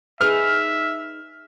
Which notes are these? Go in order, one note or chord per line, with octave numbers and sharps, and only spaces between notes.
D#4 G#4 B4 E5 F6